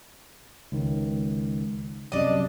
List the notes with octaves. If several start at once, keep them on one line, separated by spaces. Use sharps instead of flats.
C#2 D#3
C2 F#2 C3 D4 D#5